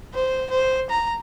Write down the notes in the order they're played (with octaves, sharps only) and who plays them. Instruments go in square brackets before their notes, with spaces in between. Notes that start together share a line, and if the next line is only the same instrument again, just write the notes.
[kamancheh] C5
C5
A#5